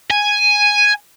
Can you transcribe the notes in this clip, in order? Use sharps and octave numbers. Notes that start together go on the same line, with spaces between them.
G#5